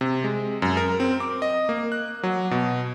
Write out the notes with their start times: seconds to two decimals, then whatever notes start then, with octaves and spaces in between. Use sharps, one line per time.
0.01 C3
0.24 G#3
0.62 F#2
0.77 A#4
1.00 C4
1.20 D6
1.42 D#5
1.69 A#3
1.92 F#6
2.23 F#3
2.51 B2